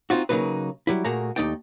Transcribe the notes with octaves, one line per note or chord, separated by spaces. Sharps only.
C4 D#4 F4 F#4
C#3 F#3 A#3 D#4 B4
F#3 G3 E4
A#2 A3 A#3 F#4 G#4 A#5
D#2 A#2 A3 D#4 D5 G5